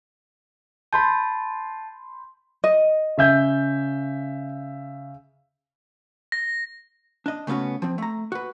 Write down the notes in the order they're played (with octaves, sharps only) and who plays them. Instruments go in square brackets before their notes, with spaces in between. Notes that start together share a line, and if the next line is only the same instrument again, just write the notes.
[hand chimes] A5 [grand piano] B5 C6 G6
[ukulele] D#5
[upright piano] C#3 E5 G6
[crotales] A#6
[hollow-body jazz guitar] D4 D#5
C#3 A3 B3 C#4 F#4
F3 C4
A3 A#5
F#4 B4